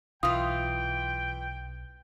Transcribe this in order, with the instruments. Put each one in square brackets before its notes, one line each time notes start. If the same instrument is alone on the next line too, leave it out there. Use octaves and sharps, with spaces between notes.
[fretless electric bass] B1 [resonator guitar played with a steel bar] E3 F4 [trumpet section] G5 [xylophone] D#6